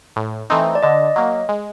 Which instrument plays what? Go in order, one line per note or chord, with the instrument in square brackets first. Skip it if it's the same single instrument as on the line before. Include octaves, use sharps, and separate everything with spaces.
[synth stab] A2
E3 A3 C4 D#4
[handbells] D5
[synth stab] D3 [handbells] D#5
[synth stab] F#3 A#3
G#3